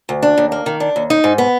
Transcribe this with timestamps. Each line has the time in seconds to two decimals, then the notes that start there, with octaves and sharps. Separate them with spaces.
0.09 D2
0.22 D4
0.38 D#2
0.52 A#3
0.66 D#3
0.80 D4
0.96 D#2
1.10 D#4
1.24 G#2
1.38 B3